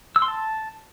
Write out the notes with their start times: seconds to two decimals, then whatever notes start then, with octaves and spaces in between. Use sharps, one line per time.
0.16 E6
0.22 C6
0.28 A5